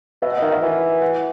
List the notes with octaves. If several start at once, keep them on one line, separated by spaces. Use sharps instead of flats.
B2 E5
F#5
D#5
D#3 E5
E5
E3
F#5